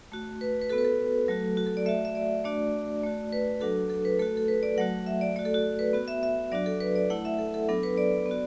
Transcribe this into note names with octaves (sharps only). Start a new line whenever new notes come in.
A3 F#4
B4
B4
B3 F#4 A4
B4
A4
F#3 A3 F#4
F#4
A4
D5
A3 F#4 E5
E5
D5
A3 D4 F#4 D5
A3 F#4
B4
F#3 D4 F#4 A4
A4
B4
A3 F#4 A4
A4
B4
D5
F#3 A3 F#4 F#5
E5
D5
A3 F#4 D5
A4
F#4
B4
B3 F#4
E5
E5
F#3 D4 F#4 D5
A4
B4
D5
A3 E4 F#5
E5
A4
A4
F#3 B3 D4 A4
B4
D5
B3
F#4